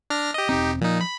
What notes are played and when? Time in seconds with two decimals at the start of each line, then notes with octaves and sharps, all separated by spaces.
0.10 D4 F6 A#6
0.34 G4 D#5
0.49 E1 C4 D#4 G4
0.81 A#2 F3 D#4
1.01 B5